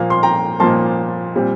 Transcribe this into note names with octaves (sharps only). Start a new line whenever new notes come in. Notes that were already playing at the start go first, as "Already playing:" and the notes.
Already playing: A#2 F3 A#3 F5
C6
G5 A#5
A#2 F3 A#3 A5 C6
A#2 G3 C4